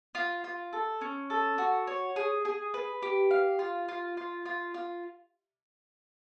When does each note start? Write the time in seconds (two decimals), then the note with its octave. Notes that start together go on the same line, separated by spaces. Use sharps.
0.15 F4
0.44 F4
0.73 A4
1.01 C#4
1.30 A4
1.58 F#4
1.87 C#5
2.16 G#4
2.45 G#4
2.74 B4
3.03 G4
3.31 F5
3.59 F4
3.88 F4
4.17 F4
4.45 F4
4.74 F4